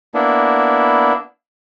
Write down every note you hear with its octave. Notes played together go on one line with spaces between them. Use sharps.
A#3 B3 D4 E4